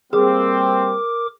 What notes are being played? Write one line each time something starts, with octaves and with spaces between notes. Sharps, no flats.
G3 A#3 C4 G#4 A#4 D6